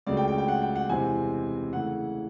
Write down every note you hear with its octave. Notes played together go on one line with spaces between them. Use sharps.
C#2 C#3 F#3 A3 D5
G5
G5
G5
F#5
G5
F#5
E2 C3 E3 G#3 C4 G#5
C#3 E3 A3 F#5